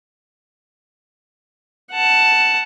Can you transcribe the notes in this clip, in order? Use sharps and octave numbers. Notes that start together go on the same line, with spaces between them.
F#5 A5